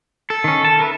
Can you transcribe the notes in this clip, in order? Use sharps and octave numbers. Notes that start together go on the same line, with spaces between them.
A4
D#3 C#4
A5
A#4 B4 E5